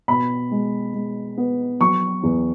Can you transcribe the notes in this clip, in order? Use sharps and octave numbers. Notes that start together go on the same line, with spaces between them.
B2 B5
G#3
G#3
B3
F#3 C#6
E2